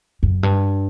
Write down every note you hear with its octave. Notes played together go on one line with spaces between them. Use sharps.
F#2
G2